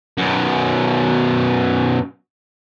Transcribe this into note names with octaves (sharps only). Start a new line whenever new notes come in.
F#2 B2